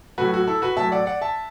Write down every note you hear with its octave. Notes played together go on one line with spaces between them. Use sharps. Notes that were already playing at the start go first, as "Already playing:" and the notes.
A2 F#3 A3 F#4 B4
F#4
E4 A4
F#4 B4
A2 F#3 A3 E5 A5
D5 F#5
D5 F#5
E5 A5